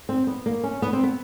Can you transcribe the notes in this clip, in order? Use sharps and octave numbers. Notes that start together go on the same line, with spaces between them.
C4
B3
A#3
C#4
B3
C4
B3